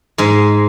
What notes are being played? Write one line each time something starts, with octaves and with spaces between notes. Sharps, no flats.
G#2 G#3